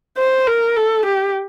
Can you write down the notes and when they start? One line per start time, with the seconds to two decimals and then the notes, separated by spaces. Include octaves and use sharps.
0.18 C5
0.48 A#4
0.76 A4
1.06 G4